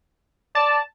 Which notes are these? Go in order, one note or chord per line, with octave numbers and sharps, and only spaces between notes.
D5 A5